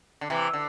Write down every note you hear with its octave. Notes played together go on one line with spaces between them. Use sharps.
D3
C3 E3
D3